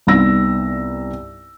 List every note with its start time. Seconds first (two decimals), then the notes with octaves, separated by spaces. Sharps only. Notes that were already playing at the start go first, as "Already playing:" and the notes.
0.07 C2 G2 B3 D#4 E6 A#6